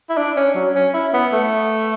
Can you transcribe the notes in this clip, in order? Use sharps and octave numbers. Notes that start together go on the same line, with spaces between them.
E4
D4
C#4
F#3
C#4
E4
B3
A3